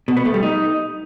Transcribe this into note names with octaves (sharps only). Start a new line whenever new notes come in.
B2
B3
A3
G3
D#4